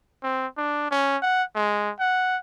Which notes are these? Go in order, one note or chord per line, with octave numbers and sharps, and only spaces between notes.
C4
D4
C#4
F#5
G#3
F#5